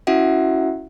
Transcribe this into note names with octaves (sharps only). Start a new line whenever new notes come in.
C#4 E4 F#4 E5 F#5